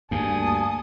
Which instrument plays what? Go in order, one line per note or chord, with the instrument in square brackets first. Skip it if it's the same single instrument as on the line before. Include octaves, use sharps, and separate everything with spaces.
[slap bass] D2 G2 [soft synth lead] A#3 [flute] G#5 [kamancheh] A5 D#6